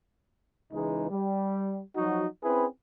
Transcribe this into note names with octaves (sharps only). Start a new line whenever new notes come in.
C#2 E3 G#3 D#4
G3
F3 F#3 D#4 F#4
C4 C#4 E4 G#4 B4